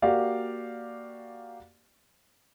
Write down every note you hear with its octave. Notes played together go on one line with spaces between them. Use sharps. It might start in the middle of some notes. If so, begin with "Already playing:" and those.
A#3 F#4 G4 D5 F5